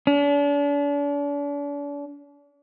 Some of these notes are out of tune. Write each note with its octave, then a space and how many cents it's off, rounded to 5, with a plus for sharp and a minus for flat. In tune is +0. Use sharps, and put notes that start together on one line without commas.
D4 -40